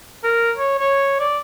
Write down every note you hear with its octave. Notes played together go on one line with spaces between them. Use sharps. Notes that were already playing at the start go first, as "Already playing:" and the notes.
A#4
C#5
C#5
D5